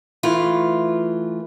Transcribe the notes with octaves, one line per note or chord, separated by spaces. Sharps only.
E3 A3 F4